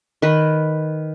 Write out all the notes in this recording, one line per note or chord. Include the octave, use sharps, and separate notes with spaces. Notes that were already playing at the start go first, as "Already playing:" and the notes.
D#3 B4